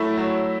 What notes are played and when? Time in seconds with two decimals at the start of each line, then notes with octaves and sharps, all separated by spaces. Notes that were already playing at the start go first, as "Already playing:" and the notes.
Already playing: F#3 A3 E4
0.17 F#3